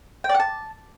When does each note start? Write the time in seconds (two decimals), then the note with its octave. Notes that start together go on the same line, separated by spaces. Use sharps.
0.24 G5
0.29 D5
0.34 F#5
0.40 A5